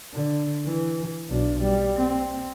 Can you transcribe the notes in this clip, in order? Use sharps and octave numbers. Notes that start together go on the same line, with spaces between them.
D3
E3
B1 D4
G3
C4